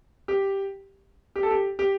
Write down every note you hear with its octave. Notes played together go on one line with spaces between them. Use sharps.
G4
G4
A4
G4
G4